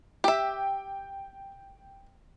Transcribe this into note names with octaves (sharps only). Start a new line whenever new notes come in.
G4 E5 G5